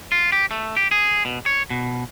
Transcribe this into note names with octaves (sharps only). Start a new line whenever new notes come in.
F4
G4
A3
G4
G#4
B2
C#5
B2